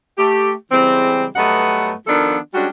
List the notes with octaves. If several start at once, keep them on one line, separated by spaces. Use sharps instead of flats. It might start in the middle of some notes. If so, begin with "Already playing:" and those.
A3 G4
C#3 E3 G3 G#3 C4
G2 F#3 A3 B3 D#5 F#5
D#3 F3 B3 D4 F4 A4
G3 G#3 C#4 D4 F#4